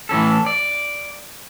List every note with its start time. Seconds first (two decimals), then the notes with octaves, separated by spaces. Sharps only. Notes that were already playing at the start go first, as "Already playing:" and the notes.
0.09 A2 E3 C#4 A4
0.46 D5